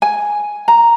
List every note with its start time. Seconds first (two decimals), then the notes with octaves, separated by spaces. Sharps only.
0.02 G#5
0.68 A#5